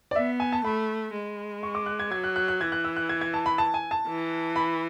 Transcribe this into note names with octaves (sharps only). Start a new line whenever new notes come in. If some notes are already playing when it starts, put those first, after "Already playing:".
D5
B3 E5
G#5
A5
A3 B5
G#3
C#6
D6
F#6
G#6
F#3 G#6
F#6
F#6
F#6
E3 G#6
F#6
E6
F#6
G#6
G#6
A5
B5
A5
G#5
A5
E3
B5